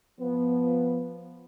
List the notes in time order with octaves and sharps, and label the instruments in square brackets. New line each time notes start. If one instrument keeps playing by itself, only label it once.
[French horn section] F3 B3